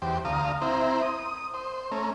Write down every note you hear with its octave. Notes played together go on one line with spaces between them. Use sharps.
E2 G4 C5
D2 F5 A#5 D#6
C4 E4 C5 A#5
D#6
C5
A3 C#4 A#5